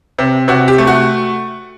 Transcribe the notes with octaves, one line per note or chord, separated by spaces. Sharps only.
C3
C3 F#4
G4
A3
F#4